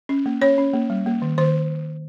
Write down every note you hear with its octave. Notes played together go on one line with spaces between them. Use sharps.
C#4
A#3
C#4 C#5
C#4
A#3
G3
A#3
D#3
D#3 C5